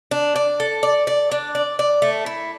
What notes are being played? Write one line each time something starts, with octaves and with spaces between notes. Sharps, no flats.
D4
D5
A4
D5
D5
D4
D5
D5
A3
E4